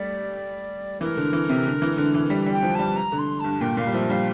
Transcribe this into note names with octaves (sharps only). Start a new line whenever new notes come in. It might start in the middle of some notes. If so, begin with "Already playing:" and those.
Already playing: G3 A3 D5
E3 A#4
D3
E3
C3
D3
E3
D3
E3
G3
G3
G5
F3
G3 A5
A#5
D3
C6
G2 A5
A#2 G5
A#2 F5
G3
F3 E5
G3 F5